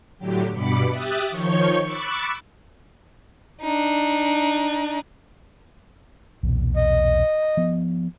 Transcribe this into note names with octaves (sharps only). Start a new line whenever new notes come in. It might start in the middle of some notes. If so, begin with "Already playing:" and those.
A2 D3 F#3 G4
G2 B2 B5 D6 C#7
G4 E5 D#6 F#6 A6
D#3 F3 C#5 C#6 G6
B5 C#6 D6 E6 F#6 A6
D4 D#4
B1 E2 A#2
D#5
F3 B3